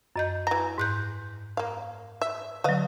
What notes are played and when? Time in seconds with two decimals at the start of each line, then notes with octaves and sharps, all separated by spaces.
0.16 F#2 D#5 G6
0.47 E3 A#5 A#6
0.78 G#2 F#6 G6
1.57 A#3 F5
2.22 E5
2.64 D3 F#3 B4 D#5 F5